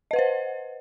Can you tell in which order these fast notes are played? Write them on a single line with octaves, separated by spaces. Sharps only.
D#5 B4 F#5 C5